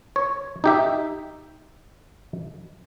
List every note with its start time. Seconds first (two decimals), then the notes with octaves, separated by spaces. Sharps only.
0.16 C#5
0.64 D#4 G4 E5